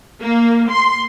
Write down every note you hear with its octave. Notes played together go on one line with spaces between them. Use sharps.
A#3
C6